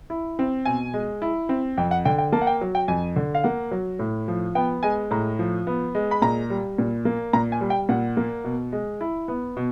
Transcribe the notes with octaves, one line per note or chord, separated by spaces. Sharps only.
E4
C4
B2 G#5
G#3
E4
C4
F2 G5
F#5
D3 G5
G5
A#3 A5
F#5
G5
F#3
G5
F2 G#5
D3
F5
A#3 F#5
F#3
A2
F3
B3 G5
G#3 G#5
A2 A#5
F3
B3
G#3
B5
A#2 A#5
G3
A#2
A#3
A#2 A#5
G#5
G3
G5
A#2 F#5
A#3
B2
G#3
E4
B3
B2